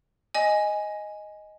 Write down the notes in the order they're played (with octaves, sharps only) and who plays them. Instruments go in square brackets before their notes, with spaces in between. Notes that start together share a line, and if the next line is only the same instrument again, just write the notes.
[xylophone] D#5 G#5